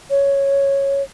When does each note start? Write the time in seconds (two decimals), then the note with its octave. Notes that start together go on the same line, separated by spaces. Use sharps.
0.10 C#5